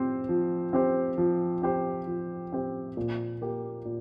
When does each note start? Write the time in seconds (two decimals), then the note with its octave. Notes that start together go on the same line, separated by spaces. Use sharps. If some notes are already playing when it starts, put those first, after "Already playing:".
Already playing: F3 C4 G4 C5
0.29 F3
0.73 C4 G4 C5
1.18 F3
1.62 C4 G4 C5
2.07 F3
2.52 C4 G4 C5
2.97 A#2
3.42 A#3 G4
3.85 A#2